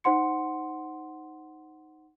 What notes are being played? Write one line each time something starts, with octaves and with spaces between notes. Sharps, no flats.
D#4 C5 F#5 C6 C#7